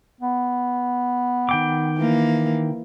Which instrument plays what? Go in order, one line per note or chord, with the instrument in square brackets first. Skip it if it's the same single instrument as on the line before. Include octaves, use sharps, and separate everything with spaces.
[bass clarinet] B3
[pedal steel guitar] D#3 G5 D6
[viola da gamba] E3 A#3